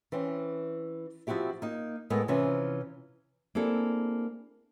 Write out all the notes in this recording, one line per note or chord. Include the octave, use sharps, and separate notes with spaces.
E3 C4 C#4
F3 C4 E4 F#4 G4 E5
A#3 D#4
A2 G#3 B3 A4 A#4
C3 E3 F3 C#4
A#3 C4 D4 E4 G#4 A4